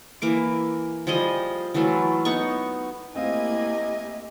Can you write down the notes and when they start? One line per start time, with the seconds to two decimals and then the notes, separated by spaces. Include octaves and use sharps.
0.22 E3 A#3 D6
1.07 F3 G3 G#4 D#5
1.74 E3 F#3 A3 F4
2.25 B3 D#4 C#6
3.15 A3 A#3 C4 E4 G4 D#5 F5 G#5